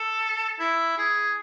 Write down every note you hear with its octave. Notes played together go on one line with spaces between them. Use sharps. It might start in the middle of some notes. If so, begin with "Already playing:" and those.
Already playing: A4
E4
G#4